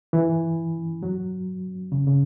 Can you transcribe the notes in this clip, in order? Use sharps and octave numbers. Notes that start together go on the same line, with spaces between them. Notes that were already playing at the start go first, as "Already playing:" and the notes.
E3
F#3
C#3
C#3